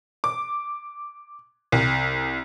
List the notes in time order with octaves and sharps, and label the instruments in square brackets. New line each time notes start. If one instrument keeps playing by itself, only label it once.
[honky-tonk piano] D6
C2